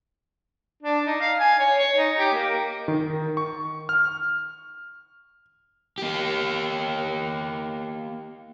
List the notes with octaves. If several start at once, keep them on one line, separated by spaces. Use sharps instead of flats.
D4
D#4
F5
G#5
C#5
C#5
D#4
G4
A#3
D#3
C#6
F6
A#3 G4